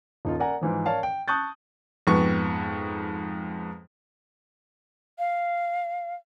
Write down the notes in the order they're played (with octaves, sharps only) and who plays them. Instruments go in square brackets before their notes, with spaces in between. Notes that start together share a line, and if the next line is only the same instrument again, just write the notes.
[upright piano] D#1 D#4 F4
A#4 D5 F#5 G#5 A#5
G#2 E3 F3
A#4 C#5 D5 F5 A5
G5
A5 C#6 D#6 F#6 G6 A6
[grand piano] F2 G#2 B3 C#6
[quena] F5